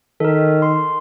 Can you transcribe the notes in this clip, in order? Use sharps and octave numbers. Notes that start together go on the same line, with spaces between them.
D#3 A4 A#4
C6